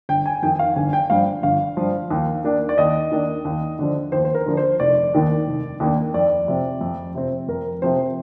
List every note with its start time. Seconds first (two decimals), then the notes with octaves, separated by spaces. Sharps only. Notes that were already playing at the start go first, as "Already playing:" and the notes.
0.09 G1 G5
0.26 G#5
0.42 F2 D#3 G5
0.59 F5
0.76 G1 G#5
0.93 G5
1.10 G2 F3 F5
1.43 G1 F5
1.77 G2 F3
2.11 D#2
2.44 D#3 A#3 D4
2.69 D5
2.78 D#2 D#5
3.12 D#3 A#3 D4
3.45 D#2
3.79 D3 F3
4.12 D#2 C5
4.25 C5
4.34 A#4
4.46 D3 F3
4.57 C5
4.80 F1 D5
5.13 D#2 D#3 A#3 D4
5.47 F1
5.80 D#2 D#3 A#3 D4
6.14 F2 D5
6.48 C3 F3 C4
6.81 F2
7.15 C3 F3 C4
7.48 F2 A#4
7.82 C3 F3 C4 C5